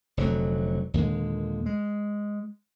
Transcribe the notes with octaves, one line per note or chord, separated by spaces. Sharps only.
F1 D3 F#3
D#2 A#2 D3 G#3
G#3